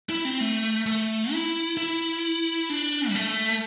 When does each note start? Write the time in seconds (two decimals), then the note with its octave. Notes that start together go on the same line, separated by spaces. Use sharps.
0.09 E4
0.25 C4
0.41 A3
0.86 A3
1.32 E4
1.77 E4
2.70 D4
3.09 G3
3.15 A3